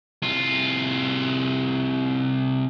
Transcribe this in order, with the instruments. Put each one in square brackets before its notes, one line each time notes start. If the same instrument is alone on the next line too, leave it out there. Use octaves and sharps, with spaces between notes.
[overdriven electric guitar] C2 F4